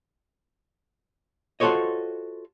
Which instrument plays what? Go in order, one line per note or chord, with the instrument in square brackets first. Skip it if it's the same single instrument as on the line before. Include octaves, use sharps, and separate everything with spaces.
[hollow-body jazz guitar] F4 F#4 A4 C5 C#5 D#5